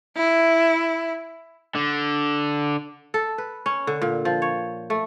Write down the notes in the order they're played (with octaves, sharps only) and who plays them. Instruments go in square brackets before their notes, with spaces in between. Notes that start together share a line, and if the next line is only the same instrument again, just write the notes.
[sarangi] E4
[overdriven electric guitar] D3
[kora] A4
B4
C#4
D3
A#2
F3
C#5
A3